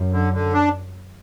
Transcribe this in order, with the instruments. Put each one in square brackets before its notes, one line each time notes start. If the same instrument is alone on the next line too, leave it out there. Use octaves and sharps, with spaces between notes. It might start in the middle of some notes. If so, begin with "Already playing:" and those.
Already playing: [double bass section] F#2
[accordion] D3
D3
D4